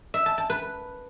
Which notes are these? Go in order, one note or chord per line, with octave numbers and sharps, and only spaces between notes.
E5
A5
A5
B4